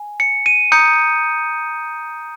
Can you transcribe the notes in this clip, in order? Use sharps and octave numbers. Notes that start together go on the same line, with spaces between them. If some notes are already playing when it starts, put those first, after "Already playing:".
Already playing: G#5
C#7
D#7
A#5 D#6 G6 C#7